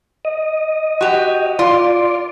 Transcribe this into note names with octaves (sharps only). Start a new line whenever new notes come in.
D#5
F#4 G4
F4 D5